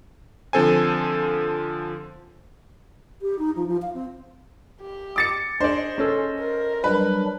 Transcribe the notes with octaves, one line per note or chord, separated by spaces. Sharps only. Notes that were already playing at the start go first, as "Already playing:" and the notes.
D3 F3 C4 A4 C5 G#5
G4
D#4
F3
F3
F5
C4
G4
D6 A6 C#7
D4 G#4 C5 D5 D#5
C#4 A4
A#4
F#3 G3 D4 B4